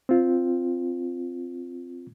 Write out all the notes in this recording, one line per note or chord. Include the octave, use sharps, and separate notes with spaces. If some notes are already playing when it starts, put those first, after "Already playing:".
C4 F4